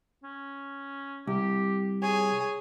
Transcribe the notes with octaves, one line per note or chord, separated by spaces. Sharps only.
C#4
C2 G4
G#4 C#5